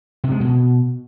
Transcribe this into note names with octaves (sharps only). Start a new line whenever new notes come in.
C3
G#3
B2